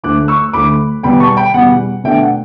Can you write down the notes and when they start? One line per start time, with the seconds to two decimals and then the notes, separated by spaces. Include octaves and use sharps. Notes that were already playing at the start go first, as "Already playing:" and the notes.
0.03 D2 D3 A3 D6 F#6
0.28 C#6 E6
0.53 D2 D3 A3 B5 D6
1.03 E2 B2 G3 G5 B5
1.20 A5 C#6
1.37 G5 B5
1.54 E2 B2 G3 F#5
2.04 B2 A3 D4 E5 G5
2.21 F#5